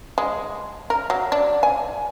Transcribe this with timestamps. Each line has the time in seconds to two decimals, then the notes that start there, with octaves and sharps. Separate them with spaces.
0.18 G#3
0.90 A#4
1.10 F#3
1.32 D4
1.63 G#5